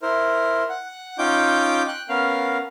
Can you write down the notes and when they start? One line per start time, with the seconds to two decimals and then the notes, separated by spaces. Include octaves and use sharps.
0.02 E4 A#4 C5
0.69 F#5
1.18 C#4 D#4 F4 G5 D6 G6
1.88 G5 F#6
2.09 B3 C#4 A#4 F5